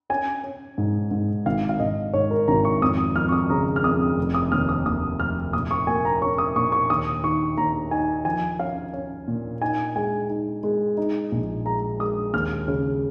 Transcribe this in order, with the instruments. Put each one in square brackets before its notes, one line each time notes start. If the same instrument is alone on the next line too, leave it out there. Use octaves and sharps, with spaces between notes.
[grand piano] C#4 G#5
C#4
G#2
G#2
G#1 F5
F5
G#1 D#5
G#2 C#5
A#4
G#1 A#5
C#6
F2 D#6
F2 F6
C#6
D#6
C#3 A#5
F6
F2 D#6
F1
D#6
D#2 F6
D#6
D#2 D#6
F1 F6
A#2 D#6
C#6
A#3 G#5
A#5
C#4 C#6
D#6
A#2 C#6
C#6
D#2 D#6
D#3 C#6
D#2 A#5
D#4 G#5
F3 G#5
C#4 F5
C#4
A#2
D#4 G#5
G#3 G#5
D#4
G#3
D#4
A#1
G#3 A#5
G#3 D#6
D#2 F6
C#3